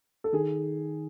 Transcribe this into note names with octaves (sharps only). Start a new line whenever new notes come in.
A4
D#3 G#4